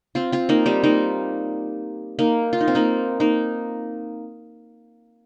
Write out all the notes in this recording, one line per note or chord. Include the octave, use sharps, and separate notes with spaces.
C4 F4
C4 F4
A#3 D#4
G3 C4
A#3 D#4
A#3 D#4
F4
D#4
C4
A#3 D#4
A#3 D#4